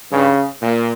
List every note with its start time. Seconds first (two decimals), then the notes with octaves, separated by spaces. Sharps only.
0.12 G2 C#3
0.62 A#2